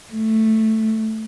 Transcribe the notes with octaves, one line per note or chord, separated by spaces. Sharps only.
A3